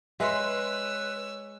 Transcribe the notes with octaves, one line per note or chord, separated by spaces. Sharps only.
G#3 B4 C#5 E5 C6 E6